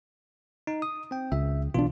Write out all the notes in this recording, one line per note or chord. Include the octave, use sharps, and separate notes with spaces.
D#4
D#6
C4 G5
C#2 E5
B1 B2 E3 D4 F4